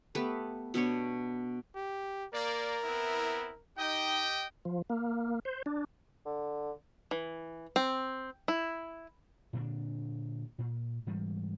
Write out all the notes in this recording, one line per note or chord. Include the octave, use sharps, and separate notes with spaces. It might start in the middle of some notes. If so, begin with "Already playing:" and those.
A3 B3 G4 B4
B2 B3 D4 C#5
G4
A#3 A#4 D5
B3 C4 E4
D#4 G4 D#5 G5
F3
A#3
C5
D4
D3
E3
C4
E4
A#2 D3 C4 D4
A#2
G#2 E3 G3